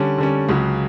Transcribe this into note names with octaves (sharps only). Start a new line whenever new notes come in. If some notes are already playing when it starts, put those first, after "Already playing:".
Already playing: D3 G3 C#4
D3 G3 C#4
C#2 C#3 F#3